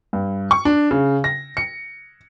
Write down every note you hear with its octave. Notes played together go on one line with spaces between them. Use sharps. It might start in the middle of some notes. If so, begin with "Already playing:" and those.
G2
C#6
D4
C#3
A#6
C#7